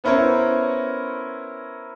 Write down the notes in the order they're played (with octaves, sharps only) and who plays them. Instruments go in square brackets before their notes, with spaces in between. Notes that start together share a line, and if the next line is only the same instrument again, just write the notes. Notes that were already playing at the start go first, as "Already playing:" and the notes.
[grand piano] B3 C#4 E4 A#4 C5 C#5